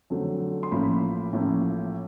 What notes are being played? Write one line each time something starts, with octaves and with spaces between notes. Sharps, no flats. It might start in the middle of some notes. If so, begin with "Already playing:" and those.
F2 D3 F#3 A3
C6
A1 A2 F3 A#3 B5
A1 A2 F3 A#3